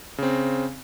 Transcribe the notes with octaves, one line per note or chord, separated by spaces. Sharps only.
C#3 C4